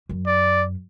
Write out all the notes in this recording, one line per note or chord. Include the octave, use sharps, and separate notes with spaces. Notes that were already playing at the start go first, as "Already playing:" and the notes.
F#2
D5